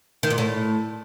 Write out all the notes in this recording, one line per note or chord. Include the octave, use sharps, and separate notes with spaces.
D#3
A#2
A2